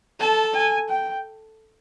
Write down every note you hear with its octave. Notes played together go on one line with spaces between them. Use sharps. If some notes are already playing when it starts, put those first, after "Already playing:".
A4 A5
G#5
G5